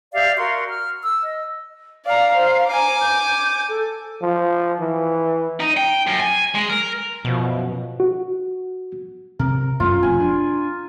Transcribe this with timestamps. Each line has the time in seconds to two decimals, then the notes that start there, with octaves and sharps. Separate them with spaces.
0.13 G4 D5 E5 F5
0.38 F#4 A#4 C6
0.68 F6
1.02 E6
1.24 D#5
2.06 D5 F5 A#5
2.35 C5
2.68 G#5 A#5 D6
3.01 G6
3.69 A4
4.22 F3
4.80 E3
5.60 D#4
5.77 G5
6.07 F#2
6.20 G#5
6.55 G#3
6.70 A#4
7.25 F#2 B2 F3
8.00 F#4
9.39 C3 A#4
9.80 F#2 A3 C#4 F4
10.03 E1 F2 G#5
10.19 D4